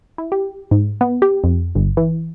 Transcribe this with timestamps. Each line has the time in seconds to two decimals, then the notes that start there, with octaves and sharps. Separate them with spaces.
0.18 E4
0.32 G4
0.71 G#2
1.01 B3
1.22 G4
1.44 F2
1.75 G1
1.97 E3